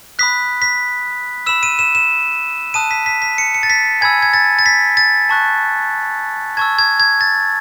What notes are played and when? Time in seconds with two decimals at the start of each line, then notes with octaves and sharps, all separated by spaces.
0.19 B5 D#6 F#6 B6
0.62 B6
1.46 B5 E6 E7
1.63 D#7
1.79 E7
1.95 E7
2.74 A5 D#6 F#6 D#7
2.91 B6
3.06 B6
3.22 B6
3.38 C#7
3.55 C#7
3.63 A6
3.70 B6
4.01 G#5 B5 E6 G#6
4.22 G#6
4.33 A6
4.59 A6
4.66 B6
4.97 A6
5.29 A5 C#6 F#6
6.57 A5 C#6 E6 G#6
6.79 G#6
7.00 G#6
7.21 A6